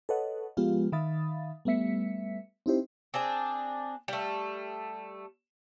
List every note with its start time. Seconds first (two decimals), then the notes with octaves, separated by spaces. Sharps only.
0.09 A4 B4 C#5 D#5 F#5
0.57 F3 G#3 B3 F4 G4 F5
0.92 D#3 E5 F5 B5 D#6 A6
1.65 G3 A3 B3 E5 B6 C#7
2.66 C4 D#4 E4 G4 C5
3.14 C4 D4 G#4
4.08 G3 A3